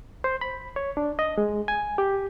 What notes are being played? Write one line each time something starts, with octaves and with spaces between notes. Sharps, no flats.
C5
B5
C#5
D4
D#5
G#3
G#5
G4